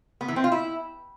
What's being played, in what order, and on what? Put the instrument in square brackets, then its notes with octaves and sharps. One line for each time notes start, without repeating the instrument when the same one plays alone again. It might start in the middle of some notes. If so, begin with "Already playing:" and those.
[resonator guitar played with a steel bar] B3
E3
C4
F4
E4